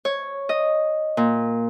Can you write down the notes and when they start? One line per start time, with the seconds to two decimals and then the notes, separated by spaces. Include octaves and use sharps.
0.05 C#5
0.49 D#5
1.17 A#2